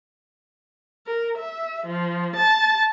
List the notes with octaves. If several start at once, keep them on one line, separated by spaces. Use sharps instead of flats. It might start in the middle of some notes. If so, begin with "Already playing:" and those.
A#4
E5
F3
A5